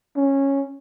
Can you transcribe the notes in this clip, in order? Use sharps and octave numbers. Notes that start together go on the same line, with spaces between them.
C#4